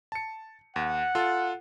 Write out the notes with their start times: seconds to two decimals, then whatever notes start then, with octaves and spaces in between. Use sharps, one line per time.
0.12 A5 C#7
0.76 D#2 F#5
1.15 F4 A4